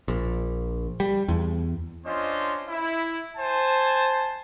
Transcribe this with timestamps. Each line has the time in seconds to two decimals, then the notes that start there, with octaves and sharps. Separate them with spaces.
0.08 A#1
1.00 G3
1.28 E2
2.06 C#4 D4 F4 C5 D#5
2.68 E4
3.37 C5 G#5 A5